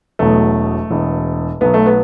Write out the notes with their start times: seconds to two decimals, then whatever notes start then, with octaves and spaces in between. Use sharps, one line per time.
0.19 E1 E2 B2 F#3 A3
0.90 E1 E2 B2
1.61 B1 B2 F#3 B3
1.74 A3
1.86 B3